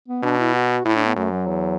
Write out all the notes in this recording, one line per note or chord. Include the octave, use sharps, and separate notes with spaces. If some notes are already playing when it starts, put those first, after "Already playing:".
B3
B2 D4
E4
F#4
A2 E4
D4
B3
F#2 A3
F#3
E2